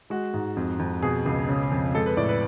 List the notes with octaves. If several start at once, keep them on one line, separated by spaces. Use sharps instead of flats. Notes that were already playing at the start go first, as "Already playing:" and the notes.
G#3 F#4
G#2
F2
F2
B2 G#4
C#2
C#3
F2
G#3 A4
B4
A2 D5
B4